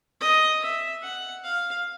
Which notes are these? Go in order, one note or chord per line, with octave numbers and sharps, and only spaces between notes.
D#5
E5
F#5
F5